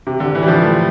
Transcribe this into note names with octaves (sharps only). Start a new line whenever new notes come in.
C3
D3
E3
G3
F3
A3